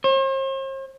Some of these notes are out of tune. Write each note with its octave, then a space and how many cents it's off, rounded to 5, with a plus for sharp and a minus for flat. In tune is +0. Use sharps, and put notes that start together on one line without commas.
C5 +45